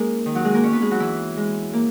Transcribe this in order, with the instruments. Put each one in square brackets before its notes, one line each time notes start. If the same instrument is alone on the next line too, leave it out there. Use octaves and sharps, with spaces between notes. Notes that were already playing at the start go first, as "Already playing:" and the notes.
Already playing: [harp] G#3 A#3 C#4 D#4 G#4 A#4
D#3 D#4
F#3 F#4
G#3 G#4
A#3 A#4
C#4 C#5
B3 B4
G#3 G#4
F#3 F#4
E3 E4
G#3
A#3